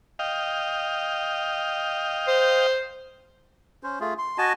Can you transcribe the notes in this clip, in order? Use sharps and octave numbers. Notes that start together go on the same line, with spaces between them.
D#5 F5 G5
C5
C#4 C5
A3 F4 G#4
C6
F#4 D#5 G#5 A5